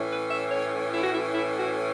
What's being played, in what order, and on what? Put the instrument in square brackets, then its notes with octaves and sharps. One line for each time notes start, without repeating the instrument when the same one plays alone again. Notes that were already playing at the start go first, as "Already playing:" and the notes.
Already playing: [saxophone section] A2 E3 C#4
B4
E5
C#5
E4
F#4
E4
E4
F#4